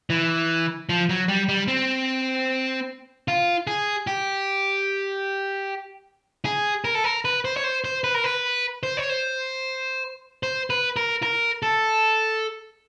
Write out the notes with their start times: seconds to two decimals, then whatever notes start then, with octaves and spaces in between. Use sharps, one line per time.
0.10 E3
0.89 F3
1.09 F#3
1.28 G3
1.49 G3
1.68 C4
3.28 F4
3.67 G#4
4.07 G4
6.45 G#4
6.84 A#4
6.95 A4
7.04 A#4
7.25 B4
7.45 C5
7.57 C#5
7.64 C5
7.84 C5
8.04 B4
8.14 A#4
8.24 B4
8.83 C5
8.97 C#5
9.09 C5
10.43 C5
10.70 B4
10.96 A#4
11.23 A#4
11.63 A4